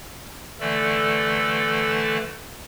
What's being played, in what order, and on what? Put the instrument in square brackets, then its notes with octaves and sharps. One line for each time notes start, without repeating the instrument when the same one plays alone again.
[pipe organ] D3 E3 A3 A4 D5